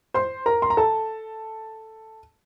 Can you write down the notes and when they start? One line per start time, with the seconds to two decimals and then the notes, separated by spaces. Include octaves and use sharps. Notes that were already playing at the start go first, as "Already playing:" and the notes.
0.14 C5 C6
0.46 A#4 A#5
0.62 C6
0.70 A#5
0.77 A4 A5